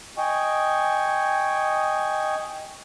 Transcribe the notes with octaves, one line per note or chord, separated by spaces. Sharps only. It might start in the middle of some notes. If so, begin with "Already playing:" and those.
D#5 G5 G#5 C#6